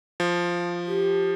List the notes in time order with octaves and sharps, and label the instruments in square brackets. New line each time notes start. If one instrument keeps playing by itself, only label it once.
[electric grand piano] F3
[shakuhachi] G4